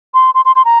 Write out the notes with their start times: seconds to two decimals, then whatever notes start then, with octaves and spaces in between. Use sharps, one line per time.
0.14 C6
0.35 C6
0.45 C6
0.56 C6
0.65 A#5